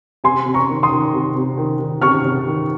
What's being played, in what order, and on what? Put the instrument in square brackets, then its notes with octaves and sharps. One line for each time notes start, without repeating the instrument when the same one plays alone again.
[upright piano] C3 G#5 C6
C3
A#5 C#6
D#3
C6 D#6
D#3
C3
C3
D#3
D#3
C3 C#6 F6
C3
D#3